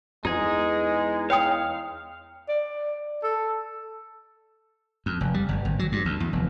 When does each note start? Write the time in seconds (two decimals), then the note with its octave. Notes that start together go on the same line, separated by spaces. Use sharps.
0.25 E2 G#3 D#4 G#4
1.30 C#5 F5 G5 D#6
2.49 D5
3.23 A4
5.06 F2
5.21 F1
5.34 G3
5.49 G1
5.65 G#1
5.79 F#3
5.92 G2
6.05 D2
6.20 E2
6.33 F1